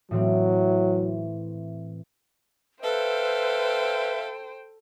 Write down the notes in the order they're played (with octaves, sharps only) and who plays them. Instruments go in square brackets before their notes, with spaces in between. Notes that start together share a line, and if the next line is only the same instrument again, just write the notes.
[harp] A2 E3 C4 [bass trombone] F#3
[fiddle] A4 [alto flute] B4 [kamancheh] C5 G5 [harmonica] E5 F5